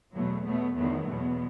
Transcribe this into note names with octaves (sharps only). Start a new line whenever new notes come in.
E2 B2 F#3 A3 B3
B2 F#3 A3 B3
E2 D#3 F#3 A3 B3
E2 B2 F#3